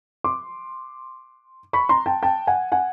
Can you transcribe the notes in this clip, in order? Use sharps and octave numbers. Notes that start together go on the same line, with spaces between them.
C6 D6
B5 C#6
A#5 C6
G5 A5
G5 A5
F#5 G#5
F#5 G#5